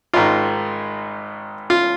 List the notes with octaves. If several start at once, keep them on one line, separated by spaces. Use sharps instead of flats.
G#1 G#2 D#3 F4
F4